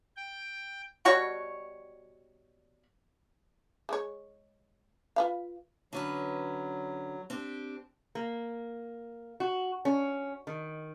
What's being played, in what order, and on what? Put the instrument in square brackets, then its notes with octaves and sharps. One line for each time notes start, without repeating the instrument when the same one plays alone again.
[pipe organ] G5
[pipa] B2 G3 F#4 C#5
[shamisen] G#3 C#5
F4 B4 F5
[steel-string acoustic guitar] D3 C#4 B4 [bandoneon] F#3
[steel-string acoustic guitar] C4 D4 G4
[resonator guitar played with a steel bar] A#3
F#4
C#4
D#3